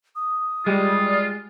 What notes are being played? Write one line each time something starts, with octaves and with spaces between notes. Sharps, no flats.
D#6
G3 G#3 F4